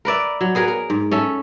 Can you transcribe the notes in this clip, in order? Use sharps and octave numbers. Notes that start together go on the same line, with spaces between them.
A#4 B4 D5 E5
F#3
B3 G#4 A#4 B4
A#4
G#2
C#4 A4 E5